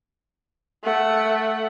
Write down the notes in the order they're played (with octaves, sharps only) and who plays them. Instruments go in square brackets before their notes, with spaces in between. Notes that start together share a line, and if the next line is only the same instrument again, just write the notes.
[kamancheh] A3 F#5